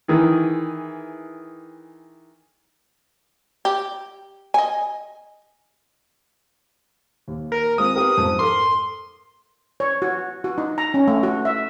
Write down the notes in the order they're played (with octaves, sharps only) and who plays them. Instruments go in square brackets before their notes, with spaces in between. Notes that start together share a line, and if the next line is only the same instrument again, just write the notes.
[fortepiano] D#3 E3 G#4
[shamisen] G4
D#5 G#5
[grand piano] D#2
[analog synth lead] A#4
[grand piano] G#3 C4 F4 [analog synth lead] D#6
[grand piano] B3 G4 A#4
F2 G#2 A5
[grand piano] A4 A#4 D6 [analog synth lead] C6
[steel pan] C#5
F#4
F#4
D#4
A#5
C#4
A3
F#4
E5